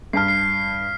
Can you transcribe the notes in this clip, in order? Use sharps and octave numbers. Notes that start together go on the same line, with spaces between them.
G2 A5 F6 B6 C7
C7